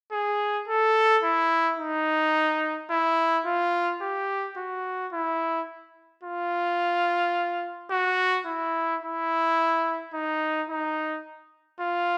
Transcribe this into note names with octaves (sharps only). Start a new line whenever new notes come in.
G#4
A4
E4
D#4
E4
F4
G4
F#4
E4
F4
F#4
E4
E4
D#4
D#4
F4